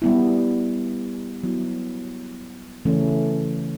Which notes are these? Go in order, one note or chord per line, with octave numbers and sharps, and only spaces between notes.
G3 B3 E4
F#3 B3 E4
C#3 E3 A3 C#4